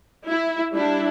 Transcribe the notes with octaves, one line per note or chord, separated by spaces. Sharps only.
E4
G3 D4 E4